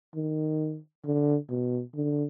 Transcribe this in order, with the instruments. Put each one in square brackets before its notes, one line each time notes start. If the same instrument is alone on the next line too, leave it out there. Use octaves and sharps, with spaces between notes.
[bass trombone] D#3
D3
B2
D3